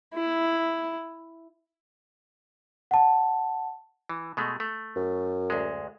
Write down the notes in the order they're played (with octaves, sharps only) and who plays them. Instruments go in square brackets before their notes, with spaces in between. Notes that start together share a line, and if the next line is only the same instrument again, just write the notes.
[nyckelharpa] E4
[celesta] F#5 A5
[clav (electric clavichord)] E3
B2 G#3 A3
A3
[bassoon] F#2
[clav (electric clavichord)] D2 G#3